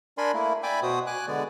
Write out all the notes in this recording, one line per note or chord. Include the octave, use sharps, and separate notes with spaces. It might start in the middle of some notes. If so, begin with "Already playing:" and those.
D4 A#4 D5 G#5 B5 C6
A3 A#3 E4
D5 E5 G5 G#5 B5 D6
B2 F#4 C5 D#6
G#5 D6 F#6
D3 G#3 B3 D5